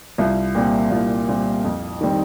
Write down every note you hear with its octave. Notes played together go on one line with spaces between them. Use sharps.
C2 F4
A#2 G3 C4
C2 F4
A#2 G3 C4
F2
D#3 G3 C4